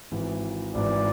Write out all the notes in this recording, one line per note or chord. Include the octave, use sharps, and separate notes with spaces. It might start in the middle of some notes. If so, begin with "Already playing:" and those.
G#1 G#2 E3
G#1 G#2 E3 D5